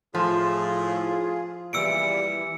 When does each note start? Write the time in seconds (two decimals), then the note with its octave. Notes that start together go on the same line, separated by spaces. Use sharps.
0.15 A2 F3 F4 G#4
1.73 E2 A#2 E3 G3 E6 C#7 D7